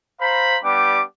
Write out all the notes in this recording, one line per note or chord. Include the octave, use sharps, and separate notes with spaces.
C5 F5 A#5 B5
G3 B3 D4 G4 D6